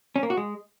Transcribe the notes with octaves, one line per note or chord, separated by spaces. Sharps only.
C#4
A#3
F#4
G#3